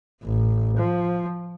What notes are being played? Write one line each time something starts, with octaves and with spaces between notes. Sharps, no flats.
A1
F3